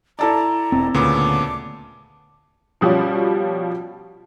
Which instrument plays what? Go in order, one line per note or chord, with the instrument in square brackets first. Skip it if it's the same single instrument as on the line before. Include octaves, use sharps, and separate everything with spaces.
[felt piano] E4 A4 D5 [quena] A#5
[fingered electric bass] E1 C4
[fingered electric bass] D2 [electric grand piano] A#2 C#3 B3 [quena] D6
[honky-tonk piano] B2 F3 G3 C#4